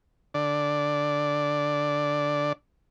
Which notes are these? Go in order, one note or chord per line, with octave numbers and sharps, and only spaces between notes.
D3 D5